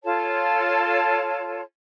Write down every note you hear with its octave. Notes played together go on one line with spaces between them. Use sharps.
F4 A4 C#5 A5